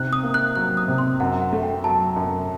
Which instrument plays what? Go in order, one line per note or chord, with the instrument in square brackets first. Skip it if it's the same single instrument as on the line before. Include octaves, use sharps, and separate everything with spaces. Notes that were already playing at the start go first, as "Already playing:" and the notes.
Already playing: [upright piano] C3 D#4 [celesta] F#6
[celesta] D#6
[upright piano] A#3
[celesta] F#6
[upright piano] F#3 [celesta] F#6
[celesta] D#6
[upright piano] C3
[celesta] C6
[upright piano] F#2 [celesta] F#5
[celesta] F#5
[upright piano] A3
[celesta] G5
[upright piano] F#3 [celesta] A5
[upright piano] F#2